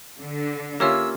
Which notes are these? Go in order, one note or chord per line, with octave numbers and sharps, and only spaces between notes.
D3
A#3 C#4 F4 G4 C#5 E5 E6